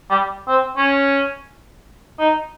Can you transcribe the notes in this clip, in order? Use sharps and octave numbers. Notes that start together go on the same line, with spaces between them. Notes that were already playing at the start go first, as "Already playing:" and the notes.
G3
C4
C#4
D#4